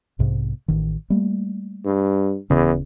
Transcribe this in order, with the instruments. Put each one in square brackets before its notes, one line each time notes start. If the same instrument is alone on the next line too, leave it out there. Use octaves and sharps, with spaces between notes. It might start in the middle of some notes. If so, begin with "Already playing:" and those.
[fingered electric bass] B1 G#2 C3
A1 D#3
G3 A3 A#3
[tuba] G2
[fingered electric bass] D1 C#3 C#4 [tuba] E2